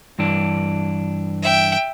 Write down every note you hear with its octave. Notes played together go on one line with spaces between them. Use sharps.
G2 E3 D4
E5 G5